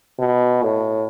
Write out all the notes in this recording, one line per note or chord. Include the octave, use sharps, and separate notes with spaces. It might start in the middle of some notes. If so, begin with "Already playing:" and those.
B2
A2